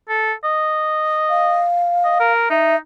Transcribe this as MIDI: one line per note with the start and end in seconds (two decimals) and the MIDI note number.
0.09 0.33 69
0.44 1.64 75
1.30 2.32 77
2.05 2.19 75
2.20 2.50 70
2.50 2.76 63
2.50 2.76 76